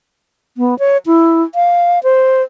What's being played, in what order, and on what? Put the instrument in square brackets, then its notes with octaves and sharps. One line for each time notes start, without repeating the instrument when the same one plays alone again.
[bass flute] B3
C#5
E4
F5
C5